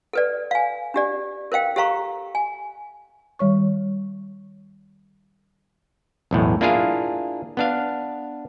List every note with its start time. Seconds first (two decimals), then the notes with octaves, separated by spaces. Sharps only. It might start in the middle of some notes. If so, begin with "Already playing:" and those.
0.13 A4 B4 D5
0.51 F5 G#5
0.94 D4 G4 D5
1.52 A#4 C5 F5 G5
1.76 G4 A4 C5 F5 A#5 C#6
2.35 G#5
3.39 D#3 G3 C#5 C#6
6.31 B1 E2 A2
6.61 A#3 D4 E4 F4 G#4 F5
7.57 B3 D4 F5